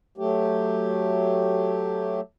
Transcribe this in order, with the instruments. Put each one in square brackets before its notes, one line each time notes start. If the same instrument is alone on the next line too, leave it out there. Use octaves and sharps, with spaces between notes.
[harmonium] F#3 A3 G4